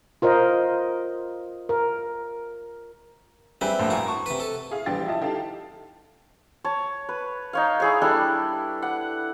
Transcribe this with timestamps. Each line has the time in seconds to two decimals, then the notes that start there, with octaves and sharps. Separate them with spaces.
0.22 F4 A#4 C5 D#5
1.69 A#4
3.61 G3 C4 E4 G#4 B4 G5
3.79 A#1 F2 A2
3.90 F#4 A#4 G#5
4.08 A5 C#6
4.26 C3 B4
4.40 A4
4.71 E4 G#4 F5
4.86 A#1 E3 G3 G4 A6
5.06 E4 F4 G4 D#5 A5
5.21 D#4 G4 A4 F5 A5
6.64 C#5 A5
7.09 B4
7.53 D#4 C#5 F5
7.80 E4 G#4 C#5
8.02 G3 D4 E4 A4
8.82 F#5